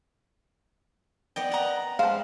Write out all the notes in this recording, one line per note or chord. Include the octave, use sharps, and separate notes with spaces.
B3 D5 D#5 G5
F#5 A#5
G#3 B4 C5 F5 A5